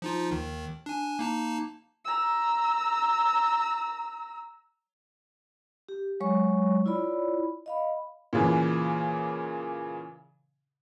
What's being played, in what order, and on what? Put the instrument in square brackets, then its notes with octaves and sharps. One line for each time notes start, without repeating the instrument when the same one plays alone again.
[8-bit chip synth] F3 D#4 F4
D#2 D#3
D4 G#5
A#3 D#4 A5
[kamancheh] A#5 E6
[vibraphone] G4
F#3 G#3 C#5 C#6
E4 F4 C#5 D5 B5
D#5 F5 B5
[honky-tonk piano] A#2 C#3 E3